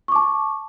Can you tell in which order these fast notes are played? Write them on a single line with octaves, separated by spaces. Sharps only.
C#6 D6 A5